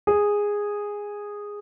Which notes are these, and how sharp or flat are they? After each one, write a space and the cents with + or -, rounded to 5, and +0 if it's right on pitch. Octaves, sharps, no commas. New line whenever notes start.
G#4 -10